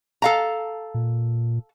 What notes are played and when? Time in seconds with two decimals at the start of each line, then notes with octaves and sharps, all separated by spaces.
0.22 A4 F5 A#5
0.94 A#2